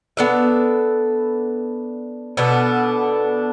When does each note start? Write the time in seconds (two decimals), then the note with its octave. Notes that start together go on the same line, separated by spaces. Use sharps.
0.17 B3 D4 A4 E5
2.37 B2 B3 D4 A4